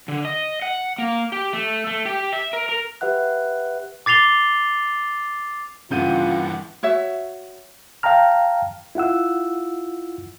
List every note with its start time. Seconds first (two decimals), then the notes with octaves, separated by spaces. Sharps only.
0.08 D3
0.25 D#5
0.62 F#5
0.98 A#3
1.32 G4
1.53 A3
1.87 A3
2.05 G4
2.33 E5
2.53 A#4
2.69 A#4
3.01 G4 B4 E5 F#5 F#6
4.06 D6 A6 C7 F7 G7
5.91 G2 C#3 E3 F4 F#5 G6 D#7
6.83 F#4 C#5 E5
8.03 F5 G5 A5 A#5 F6
8.95 E4 F4 F#5 E6